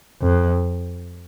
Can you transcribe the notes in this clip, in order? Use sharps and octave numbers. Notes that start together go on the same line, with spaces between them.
F2